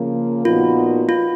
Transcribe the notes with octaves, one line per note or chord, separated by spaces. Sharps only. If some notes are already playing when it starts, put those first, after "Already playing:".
Already playing: C#3 F3 A#3
A#2 F3 B3 D#4 F4 F#4
F4